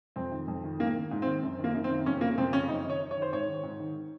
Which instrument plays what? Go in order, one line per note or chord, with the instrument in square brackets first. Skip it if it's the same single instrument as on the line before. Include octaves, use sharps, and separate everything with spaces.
[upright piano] F2 C4
D#3
F2
D#3
G#2 A#3
D#3
G#2
C4
D#3
F#2
D#3
A#3
F#2
C4
D#3
F2 C#4
C#3 A#3
F2 C4
C#3 C#4
F#2 D#4
D#3 C#5
F#2
C#5
D#3
C5
G#2 C#5
D#3
G#2
D#3